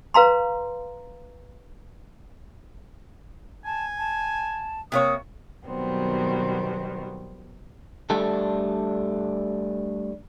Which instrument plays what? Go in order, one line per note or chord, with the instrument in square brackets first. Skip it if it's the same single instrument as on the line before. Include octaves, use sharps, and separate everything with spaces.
[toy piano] B4 F5 A#5 C6
[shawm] G#5 [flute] A5
[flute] A5
[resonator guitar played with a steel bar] C3 A#3 C#5 [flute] D#6
[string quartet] B2 D#3 F#3 G3 B3 C4
[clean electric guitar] G3 A3 D4 A4